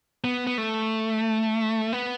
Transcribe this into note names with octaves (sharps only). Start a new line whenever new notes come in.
B3
B3
A3
B3